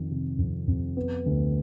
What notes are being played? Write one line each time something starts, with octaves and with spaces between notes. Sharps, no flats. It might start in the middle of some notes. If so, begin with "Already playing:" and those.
Already playing: F2 D#3
C3
F2
F2
B3
D2